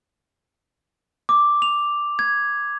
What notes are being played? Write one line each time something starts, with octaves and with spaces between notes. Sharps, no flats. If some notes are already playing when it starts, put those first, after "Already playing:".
D6
F7
G#6